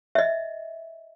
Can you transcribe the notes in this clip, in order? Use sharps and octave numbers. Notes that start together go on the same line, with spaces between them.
D#5 E5